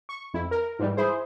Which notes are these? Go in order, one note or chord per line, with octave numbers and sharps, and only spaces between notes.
C#6
F2 E4
A#4
G#2 E3 G3
E4 G#4 C5